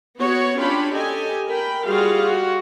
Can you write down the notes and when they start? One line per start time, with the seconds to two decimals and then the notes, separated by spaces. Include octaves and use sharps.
0.20 B3 F#4 C#5
0.59 C#4 D4 F4 G4 B5
0.93 G4 A4 D#5 G#5
1.47 A#4 G5 B5
1.87 G3 F4 F#4 G#4 F5
2.26 F#4